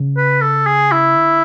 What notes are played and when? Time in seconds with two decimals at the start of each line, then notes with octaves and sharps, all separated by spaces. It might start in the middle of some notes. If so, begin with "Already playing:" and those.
Already playing: C#3
0.17 B4
0.42 A4
0.66 G#4
0.92 E4
1.16 D3